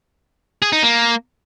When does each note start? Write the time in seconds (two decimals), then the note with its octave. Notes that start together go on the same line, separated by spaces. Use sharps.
0.62 G#4
0.73 D#4
0.83 A#3